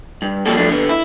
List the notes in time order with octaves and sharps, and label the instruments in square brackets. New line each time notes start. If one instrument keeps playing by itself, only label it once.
[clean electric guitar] G2
F3 G3 A#3 C4 F#4 A4
F3 F#3 A3 D4
D3 B3
E4